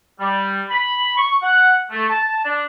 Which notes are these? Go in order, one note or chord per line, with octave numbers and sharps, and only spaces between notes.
G3
B5
C#6
F#5
A3
A5
D4